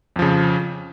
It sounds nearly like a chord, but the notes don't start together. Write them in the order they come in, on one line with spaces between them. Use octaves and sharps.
F2 F3 C#3